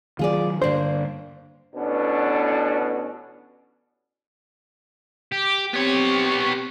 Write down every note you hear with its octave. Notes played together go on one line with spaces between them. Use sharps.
D#3 F#3 F4 G#4 D5
G2 D3 A#3 D4 C5
A1 B2 B3 C#4 D4 A4
G4
B3 C4 G4 C#5